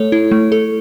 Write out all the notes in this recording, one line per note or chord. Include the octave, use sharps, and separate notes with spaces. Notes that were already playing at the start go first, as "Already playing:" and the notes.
Already playing: A3 A4 C#5
E4
A3
A4